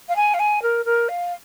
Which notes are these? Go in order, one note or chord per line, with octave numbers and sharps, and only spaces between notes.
F5
G#5
F5
G#5
A#4
A#4
F5